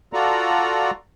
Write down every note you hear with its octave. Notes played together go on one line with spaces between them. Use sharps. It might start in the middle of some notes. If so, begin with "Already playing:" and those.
F4 F#4 A4 D5 A#5